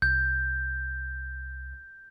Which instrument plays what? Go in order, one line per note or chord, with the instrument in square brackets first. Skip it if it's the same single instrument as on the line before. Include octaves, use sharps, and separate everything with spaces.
[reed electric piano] C2 [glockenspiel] G6